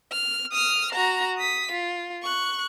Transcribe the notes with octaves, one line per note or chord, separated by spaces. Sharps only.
F6
D#6 F6
F#4 A#5
D#6 B6
F4
C#6 F#6